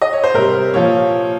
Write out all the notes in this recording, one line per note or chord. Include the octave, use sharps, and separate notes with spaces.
D#5
C#5
C5
C3 G3 A#4
A#2 F3 C#5